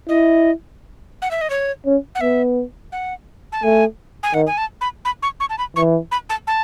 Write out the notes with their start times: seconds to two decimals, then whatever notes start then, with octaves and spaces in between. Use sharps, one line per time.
0.09 E4 D#5
1.22 F#5
1.31 E5
1.41 D#5
1.50 C#5
1.86 C#4
2.15 F#5
2.21 B3 E5
2.92 F#5
3.52 A5
3.63 A3 G#5
4.23 G#5
4.34 D#3 F#5
4.47 G#5
4.58 A5
4.81 B5
5.05 B5
5.23 C#6
5.40 C#6
5.50 A5
5.58 B5
5.76 E3 C#6
6.12 B5
6.30 A5
6.47 A5